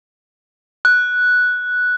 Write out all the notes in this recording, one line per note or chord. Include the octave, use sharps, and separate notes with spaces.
F#6